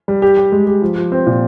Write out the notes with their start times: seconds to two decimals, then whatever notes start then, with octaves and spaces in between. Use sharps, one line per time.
0.08 G3
0.22 G4
0.37 G4
0.52 G#3
0.67 G4
0.82 F3
0.96 F3
1.12 C4
1.27 A#2